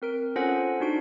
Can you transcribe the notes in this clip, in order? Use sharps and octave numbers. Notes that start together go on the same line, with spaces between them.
C4 A#4 D7
C#4 F4 A4 C5 F#5 G#5
D4 D#4 F#4 D7